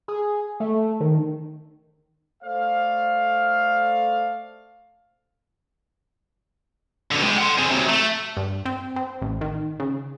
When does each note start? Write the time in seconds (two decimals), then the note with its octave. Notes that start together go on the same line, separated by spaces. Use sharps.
0.08 G#4
0.60 A3
1.00 D#3
2.43 A3 A4 C5 D5 F5
7.11 B2 D3
7.22 G#3 G4
7.37 F#5 C6
7.58 C4 G#4
7.70 C3 F#3
7.89 A3
8.37 G2
8.66 C4
8.96 C4
9.22 A1
9.41 D#3
9.80 C#3